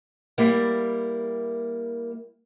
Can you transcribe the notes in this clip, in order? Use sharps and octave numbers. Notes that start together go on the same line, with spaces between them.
G3 A#3 E4